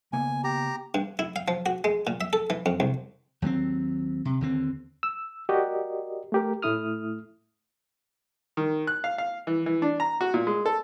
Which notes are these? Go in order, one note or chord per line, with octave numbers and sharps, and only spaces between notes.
C#3 A#3 B3 G#5
G4 A#5
G2
E4
F5
F3
F#4
G#3
A#2
E5
A4
E3
F2
C2
D#2 F#3 G#3 C4
C3
D#2 D3 C4
E6
F#4 G4 A#4 D5 D#5
A3 G4 A#4
A2 A3 E4 D#6 F6
D#3
F#6
F5
F5
E3
E3
D4
A#5
F#4
A#2
G#3
A4